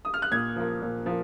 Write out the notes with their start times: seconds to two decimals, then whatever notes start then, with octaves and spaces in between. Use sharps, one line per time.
0.05 D#6
0.14 F6
0.22 F#6
0.32 A#2 G#6
0.56 F3 A#3
0.82 A#2
1.06 F3 A#3